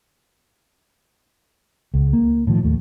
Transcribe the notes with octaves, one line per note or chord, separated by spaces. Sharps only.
C#2
A#3
A2 D#3 F3
D#2 A3